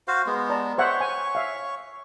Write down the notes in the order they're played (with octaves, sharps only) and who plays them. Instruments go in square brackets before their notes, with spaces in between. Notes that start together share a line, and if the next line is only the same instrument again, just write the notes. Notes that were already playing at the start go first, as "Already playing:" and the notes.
[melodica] F#4 C5 F5
G#3 B3
[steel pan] D5 A5 A#5
[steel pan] C5 E5 F#5 [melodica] C#5 C#6
[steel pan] G#5
E5 F5